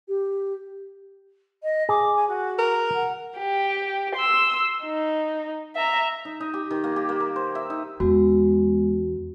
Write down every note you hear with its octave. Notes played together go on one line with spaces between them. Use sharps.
G4
D#5
G#4 D6
G#5
F#4
A#4
F#5
G4
C6 E6
D#4
E5 A#5
D#4
D#4
G4
D#3
A#3
G4
A#3
A#4
C5
E5
D#4
E2 G#3 B3 F#4